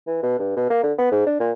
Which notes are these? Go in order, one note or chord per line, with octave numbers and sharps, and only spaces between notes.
E3
B2
G2
B2
A#3
D3
B3
G#2
D4
A#2